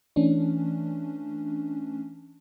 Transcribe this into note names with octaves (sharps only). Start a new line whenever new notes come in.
E3 A3 C#4 D4